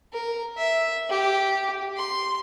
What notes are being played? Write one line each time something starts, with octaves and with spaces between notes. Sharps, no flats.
A#4
E5
G4
C6